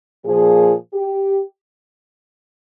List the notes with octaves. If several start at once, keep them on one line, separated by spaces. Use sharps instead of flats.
A#2 F3 G#4
G4